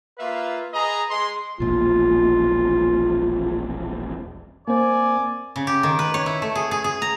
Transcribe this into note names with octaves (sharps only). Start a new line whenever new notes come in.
A#3 F4 B4 E5 F5
G#4 B4 D#5 A#5
G#3 C6
E1 A#1 F4
A#3 C4 C5 D5 G#5
C#3
G4
D#3
B4
C#5
E4
A3
G#4
G#4
G#4
A#5